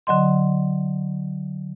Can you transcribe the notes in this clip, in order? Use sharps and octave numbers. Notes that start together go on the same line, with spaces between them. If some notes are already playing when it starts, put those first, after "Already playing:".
D3 F#3 D#5 C6